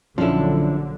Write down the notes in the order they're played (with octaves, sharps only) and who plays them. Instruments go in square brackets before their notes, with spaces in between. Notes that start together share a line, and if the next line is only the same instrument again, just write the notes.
[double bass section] A#1 D3 F#3 [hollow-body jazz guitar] F3 C#4 E4 [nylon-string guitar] D4 A4